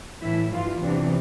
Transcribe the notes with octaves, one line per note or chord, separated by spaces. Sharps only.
A2 E3 E4
G2 E3 F4
E2 C3 E3 D4